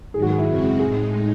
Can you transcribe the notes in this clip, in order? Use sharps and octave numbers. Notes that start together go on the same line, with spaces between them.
G#2 D#3 F#3 G#4
F#4
G#4
E4
F#2 C#3 G#3 C4 F#4
A2 G#3 D#4 G#4